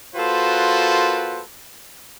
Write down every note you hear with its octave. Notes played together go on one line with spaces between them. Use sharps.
A#3 F4 F#4 A4 B4 C5